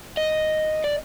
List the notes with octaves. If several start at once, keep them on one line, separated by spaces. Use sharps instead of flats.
D#5
D5